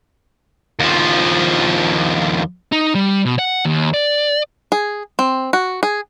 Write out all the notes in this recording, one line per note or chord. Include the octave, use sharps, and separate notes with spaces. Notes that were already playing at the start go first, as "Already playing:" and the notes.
D#2 F3
D#4
G3
B2
F#5
D#2
D5
G#4
C4
F#4
G#4